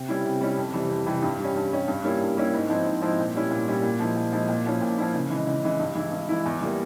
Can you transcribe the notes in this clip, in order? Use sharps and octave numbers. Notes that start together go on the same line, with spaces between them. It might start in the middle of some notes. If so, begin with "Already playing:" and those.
Already playing: C3
G3 C#4 E4
C3
G3 C#4 E4
F2
C3 E3 G3
F2
C3 E3 G3
G2
G3
C#4
G2
G3 C#4
G2
G3 A#3 C#4 E4
G2
G3 A#3 C#4 E4
G#2
F3 G#3 C4 E4
G#2
F3 G#3 C4 E4
A#2
G3 C#4 E4
A#2
G3 C#4 E4
A#2
F3 G#3 E4
A#2
F3 G#3 E4
A#2
F3 A#3 C#4 E4
A#2
F3 A#3 C#4 E4
C#3
E3 G#3
C#3
E3 G#3
G2
E3 G#3 E4
G2
E3 G#3 E4
E2
E3 G3 A#3